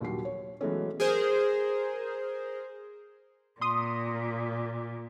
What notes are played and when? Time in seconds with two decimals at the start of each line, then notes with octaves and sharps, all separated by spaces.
0.01 A#1 D#2 F#3 G3 C7
0.25 C#5
0.61 E3 F#3 G#3 A3 B3 C#4
1.00 G#4 A#4 C5
3.61 A#2 C6 D#6